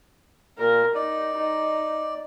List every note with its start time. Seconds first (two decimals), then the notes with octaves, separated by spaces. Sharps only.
0.58 A#2 A#4
0.95 D#4 D5
1.37 D#4